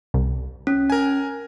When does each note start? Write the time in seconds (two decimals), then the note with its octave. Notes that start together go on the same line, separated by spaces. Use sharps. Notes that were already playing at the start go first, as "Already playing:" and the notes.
0.14 C2
0.67 C#4
0.90 A#4 G#5